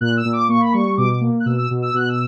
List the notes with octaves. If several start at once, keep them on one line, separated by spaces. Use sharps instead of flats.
A#2 F#6
E6
A#2
D6
A#3 C#6
B5
G3 C#6
B2 D6
A#3
F#6
B2 E6
E6
B2
E6
B2 F#6
E6